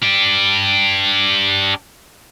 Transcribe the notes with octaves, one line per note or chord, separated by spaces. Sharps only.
D4 G4